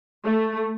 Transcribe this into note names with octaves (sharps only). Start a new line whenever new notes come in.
A3